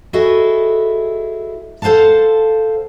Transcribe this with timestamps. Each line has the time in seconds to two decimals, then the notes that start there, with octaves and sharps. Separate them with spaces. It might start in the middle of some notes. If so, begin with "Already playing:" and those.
0.13 E4 F#4 G#4 A4 D#5
1.82 A4 C5 F5 F#5 A5